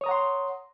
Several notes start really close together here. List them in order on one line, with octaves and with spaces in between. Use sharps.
C#5 D#6 A#5 F#5 C6